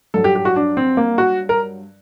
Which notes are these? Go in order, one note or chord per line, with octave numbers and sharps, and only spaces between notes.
G2 F#3 A4
G4
G4
F#4
D4
C4
A#3
F#4
A#4